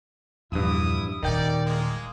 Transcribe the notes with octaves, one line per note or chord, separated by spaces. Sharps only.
A#1 E2 G2 E4 D#6
D#1 D#3 G3 D#4 D5 G5
G#3 A#3